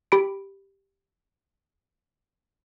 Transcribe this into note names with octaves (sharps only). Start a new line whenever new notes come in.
G4 B5 D7